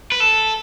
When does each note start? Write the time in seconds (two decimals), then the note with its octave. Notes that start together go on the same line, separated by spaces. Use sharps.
0.12 B4
0.20 A4